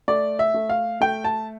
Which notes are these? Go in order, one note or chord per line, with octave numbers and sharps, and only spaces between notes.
A3 D5
E5
A3
F5
A3 G5
A5